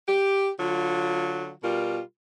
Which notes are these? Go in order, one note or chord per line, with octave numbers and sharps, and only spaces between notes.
G4
D3 F#3 F4
B2 G3 F4 A#4